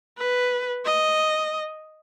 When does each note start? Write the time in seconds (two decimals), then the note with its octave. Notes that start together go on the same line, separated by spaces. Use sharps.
0.18 B4
0.85 D#5